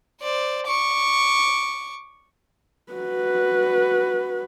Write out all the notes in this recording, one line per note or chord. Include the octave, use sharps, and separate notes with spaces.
C5 D5
C#6 D6
F#4 B4